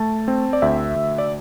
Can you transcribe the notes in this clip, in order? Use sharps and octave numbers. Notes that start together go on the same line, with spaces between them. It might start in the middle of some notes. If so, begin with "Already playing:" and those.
Already playing: A3 A5
C4
D5
D2 E5
D2
D5